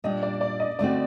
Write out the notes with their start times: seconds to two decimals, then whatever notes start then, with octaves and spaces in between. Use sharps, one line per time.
0.04 A#2 G3 D4 D#5
0.23 D5
0.41 D5
0.60 D#5
0.79 D3 A3 C4 F#4 D5